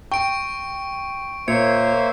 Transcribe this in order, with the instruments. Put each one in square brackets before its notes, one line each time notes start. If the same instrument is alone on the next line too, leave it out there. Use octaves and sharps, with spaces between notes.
[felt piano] G5 [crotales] C#6 D7
[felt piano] A#2 [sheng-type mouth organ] A#3 C5 E5 [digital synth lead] C#5 [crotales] C#7